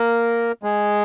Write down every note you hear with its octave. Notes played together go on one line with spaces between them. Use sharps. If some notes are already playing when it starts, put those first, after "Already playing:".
Already playing: A#3 A#4
G#3 G#4